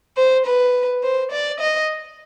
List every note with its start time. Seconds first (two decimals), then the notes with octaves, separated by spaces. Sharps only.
0.17 C5
0.46 B4
1.03 C5
1.31 D5
1.60 D#5